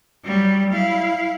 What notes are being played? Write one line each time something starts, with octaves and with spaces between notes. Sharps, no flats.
F#3 G3
E4 F5